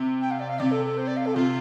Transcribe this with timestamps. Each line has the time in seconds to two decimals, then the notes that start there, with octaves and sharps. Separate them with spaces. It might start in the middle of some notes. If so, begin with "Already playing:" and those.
Already playing: C3
0.21 G5
0.31 F5
0.40 D5
0.49 F5
0.59 C3 D5
0.71 A4
0.85 A4
0.97 C5
1.07 D5
1.17 F5
1.26 A4
1.35 C3 F4